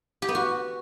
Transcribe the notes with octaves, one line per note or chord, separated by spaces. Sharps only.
G4
B3
F#4